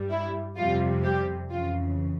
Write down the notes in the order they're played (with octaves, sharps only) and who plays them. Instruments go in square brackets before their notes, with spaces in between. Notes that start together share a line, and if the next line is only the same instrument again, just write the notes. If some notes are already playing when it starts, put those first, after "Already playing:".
Already playing: [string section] G2 G3
E4
F2 C3 G3 F4
G3 G4
F2 C#3 E3 F4